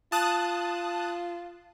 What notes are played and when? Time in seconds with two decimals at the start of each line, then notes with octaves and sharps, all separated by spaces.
0.12 F4 A5 D#6 F#6